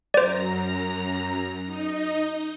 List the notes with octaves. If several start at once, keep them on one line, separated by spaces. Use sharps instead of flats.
F#2 C5 D5 A#5
D#4 D#5